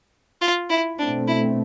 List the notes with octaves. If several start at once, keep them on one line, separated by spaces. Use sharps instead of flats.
F4
E4
B2 A3 C4 D4
E4